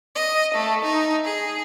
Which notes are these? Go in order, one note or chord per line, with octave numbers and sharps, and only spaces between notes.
D#5
A3
D#4
G#4